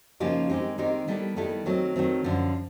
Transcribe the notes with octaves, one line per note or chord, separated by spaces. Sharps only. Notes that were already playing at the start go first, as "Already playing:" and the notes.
C#3 F3 A#3 D#4 G4
D#3 G#3 C4 D#4 G4
D#3 G#3 C4 D#4 G4
D#3 G3 B3 E4 A4
D#3 G3 B3 E4 A4
D#3 F#3 A3 C4
D#3 F#3 A3 C4
F#2 D3 F3